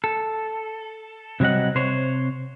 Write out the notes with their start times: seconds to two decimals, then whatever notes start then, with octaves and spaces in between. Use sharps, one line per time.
0.04 A4
1.40 C3 F#3 G3 D#5 F#5
1.75 C3 C5 C#5